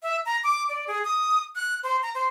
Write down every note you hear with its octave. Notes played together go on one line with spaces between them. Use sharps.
E5
A#5
D6
D5
G#4
D#6
F#6
C5
A#5
C5